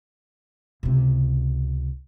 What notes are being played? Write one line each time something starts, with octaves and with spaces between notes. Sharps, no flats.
C#2 C3